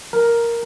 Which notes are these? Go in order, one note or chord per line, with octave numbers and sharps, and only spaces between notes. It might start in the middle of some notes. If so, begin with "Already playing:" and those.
A#4